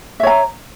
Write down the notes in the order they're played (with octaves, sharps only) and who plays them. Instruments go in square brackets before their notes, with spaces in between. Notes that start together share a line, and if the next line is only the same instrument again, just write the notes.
[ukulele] E5
C#5
A#5